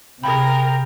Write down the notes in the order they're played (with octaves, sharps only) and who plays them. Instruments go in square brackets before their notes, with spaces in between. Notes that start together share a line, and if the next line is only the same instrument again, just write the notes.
[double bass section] C3 [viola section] G#4 A#4 [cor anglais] G5 [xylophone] B5